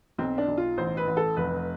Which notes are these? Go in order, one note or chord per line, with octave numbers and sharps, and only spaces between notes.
B1 C4
D4
B1
F4
A1 C5
B4
A1
A4
F1 B4